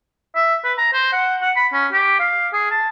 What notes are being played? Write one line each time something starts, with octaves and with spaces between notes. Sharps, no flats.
E5
B4
A#5
C5
F#5
F#5
B5
C#4
G4
F5
G#4
A5